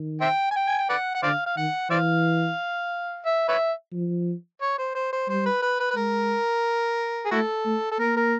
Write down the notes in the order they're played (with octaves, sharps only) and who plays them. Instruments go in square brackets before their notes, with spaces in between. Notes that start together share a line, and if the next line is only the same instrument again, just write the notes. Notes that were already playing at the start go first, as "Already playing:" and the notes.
Already playing: [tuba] D#3
[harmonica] C5 E5 G5
G#5
G5
G#5
G5
B4 D5 F#5
F#5
[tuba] D3 [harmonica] C5 D5 F5
[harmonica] F5
[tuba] D#3 [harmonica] F#5
[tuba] E3 [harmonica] C5 D5 F5
[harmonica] E5
B4 C#5 E5
[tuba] F3
[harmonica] C#5
C5
C5
C5
[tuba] G3 [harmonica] C5
[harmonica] B4
B4
B4
B4
[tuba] G#3 [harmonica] A#4
[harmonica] G#4
[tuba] A3 [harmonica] E4 F#4 A4
[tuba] A3
[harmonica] A4
[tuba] A#3 [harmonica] A#4
[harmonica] A#4